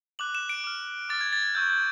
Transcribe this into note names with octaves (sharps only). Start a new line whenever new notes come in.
D6 F#6 F#7
E7
D7
D6 F6
D6 F6 A6
G#6
A6
G#6
C#6 E6 G6
G6